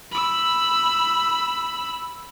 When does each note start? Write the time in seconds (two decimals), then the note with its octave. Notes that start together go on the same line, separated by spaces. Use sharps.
0.11 B5 E6